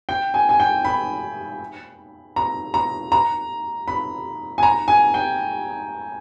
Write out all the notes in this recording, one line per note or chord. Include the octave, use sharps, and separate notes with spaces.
G5
G#5
G#5
G5
B5
A#5
A#5
A#5
B5
G#5
A#5
G#5
G5